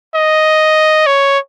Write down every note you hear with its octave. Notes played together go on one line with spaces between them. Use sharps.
D#5
C#5